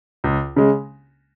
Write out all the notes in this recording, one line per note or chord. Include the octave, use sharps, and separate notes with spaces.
C#2
C#3 G#3